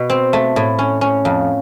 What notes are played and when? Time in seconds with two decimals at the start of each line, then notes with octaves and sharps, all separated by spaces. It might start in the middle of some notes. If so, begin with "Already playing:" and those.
Already playing: B2
0.10 C4
0.33 A3
0.56 A2
0.79 C#4
1.01 C#4
1.25 F2